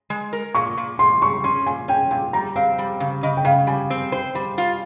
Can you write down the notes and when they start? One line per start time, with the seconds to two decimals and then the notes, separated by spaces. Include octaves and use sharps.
0.10 G#3
0.33 A#4
0.55 A#2 C#6
0.77 A#2
0.99 A#2 C6
1.22 G3 C#6
1.44 C#4 C6
1.66 A#2 G#5
1.88 C#4 G5
2.11 A#2 G5
2.33 G3 A#5
2.56 C4 F5
2.78 G3
3.00 C#3
3.23 C#3 D#5
3.37 G5
3.45 C#3 F5
3.67 G3 G#5
3.90 C4
4.12 C5
4.35 G3
4.58 F4